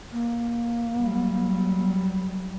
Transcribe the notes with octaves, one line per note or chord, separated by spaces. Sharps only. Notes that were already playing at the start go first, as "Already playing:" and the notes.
A#3
F#3 G3